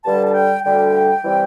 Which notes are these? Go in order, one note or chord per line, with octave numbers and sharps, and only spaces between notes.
G2 D3 G3 A5
A5
G5
D2 D3 G3 G5
C3 E3 G3